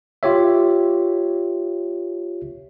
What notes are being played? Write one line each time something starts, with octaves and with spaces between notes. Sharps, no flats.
F4 G4 C#5 E5